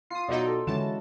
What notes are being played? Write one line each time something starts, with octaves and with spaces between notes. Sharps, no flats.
F4 D#6 C7
B2 F#3 D#4 D5
A4
D3 E3 G#3 C#4 E4 F#4 A5